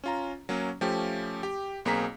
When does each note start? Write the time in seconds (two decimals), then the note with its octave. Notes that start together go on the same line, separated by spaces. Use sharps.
0.04 C#4 F4 A#5
0.49 F#3 A#3 C#4
0.81 F3 A3 C#4 G4
1.43 G4 G5
1.85 B1 A#3 C4 G#4 A#5 B6